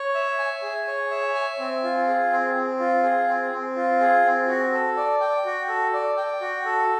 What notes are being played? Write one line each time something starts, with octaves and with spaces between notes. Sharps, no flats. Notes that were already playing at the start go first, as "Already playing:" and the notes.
Already playing: C#5
E5
G#5
G#4
C#5
E5
G#5
C4
F4
G#4
C4
C4
F4
G#4
C4
C4
F4
G#4
C4
F#4
A4
D5
G5
F#4
A4
D5
G5
F#4
A4